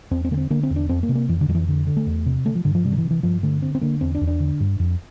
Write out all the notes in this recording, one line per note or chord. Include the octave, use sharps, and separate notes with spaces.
E2 C4
C4
D3 A#3
C4
D3 A#3
C4
E2
D4
F2 C4
A#3
C3
A#3
F2 E3
D3
F2 F3
E3
D3
D3
A3
E2
C3
D3 A3
F3
G2 D3
F3
C3 G3
D3
E3
C3
E3
G2 F3
D3 A3
D3 C4
C4
D3 A#3
E2 C4
D4
E2
D4
D3
G2
F2